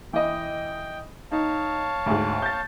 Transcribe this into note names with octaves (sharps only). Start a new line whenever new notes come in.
E3 D#5 G5
D#4 C#5 F5 A5
D2 G#2
G6 A6